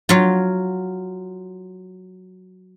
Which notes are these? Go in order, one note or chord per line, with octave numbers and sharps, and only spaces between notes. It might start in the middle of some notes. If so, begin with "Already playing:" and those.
F#3 F4